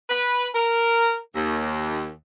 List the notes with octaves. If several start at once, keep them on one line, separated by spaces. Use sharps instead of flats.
B4
A#4
D#2